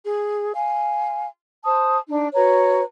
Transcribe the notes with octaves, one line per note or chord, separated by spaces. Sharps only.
G#4
F5 G#5
C5 A5 D#6
D4 D#4
F#4 B4 C#5 A#5